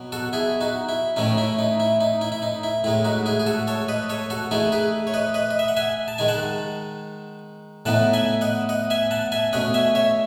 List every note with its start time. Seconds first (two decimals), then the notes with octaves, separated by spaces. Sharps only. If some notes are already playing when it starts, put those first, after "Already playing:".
Already playing: B2 F#3 B3
0.12 F#4 A4
0.33 E4 G#4
0.61 D#4 F#4
0.89 E4
1.16 A2 E3 A3 C#4 D#4
1.38 E4
1.59 D#4
1.80 E4
2.01 D#4
2.21 E4
2.32 E4
2.42 D#4
2.63 E4
2.84 A2 G#3 D#4 E4
3.04 D#4 F#4
3.26 E4 G#4
3.40 G#4
3.47 F#4 A4
3.67 A4 C#5
3.89 B4 D#5
4.09 A4 C#5
4.30 F#4 A4
4.51 E3 A3 D#4 E4 G#4
4.72 G#4 B4
5.07 C#5
5.14 B4 D#5
5.34 B4 D#5
5.51 D#5
5.59 E5
5.68 F#5
5.77 E5 G#5
6.08 A5
6.18 D#3 G#3 D#4 G#5
6.28 F#5 A5
7.86 A2 E3 B3 D#4 F#5 A5
8.13 E5 G#5
8.41 D#5 F#5
8.69 D#5 F#5
8.90 E5 G#5
9.11 F#5 A5
9.32 E5 G#5
9.53 B2 A3 C#4 D#5 F#5
9.74 E5 G#5
9.95 C#5 E5